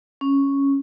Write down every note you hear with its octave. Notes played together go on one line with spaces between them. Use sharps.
C#4